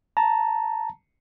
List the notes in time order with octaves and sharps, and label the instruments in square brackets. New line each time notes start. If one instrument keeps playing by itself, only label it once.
[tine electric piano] A5 A#5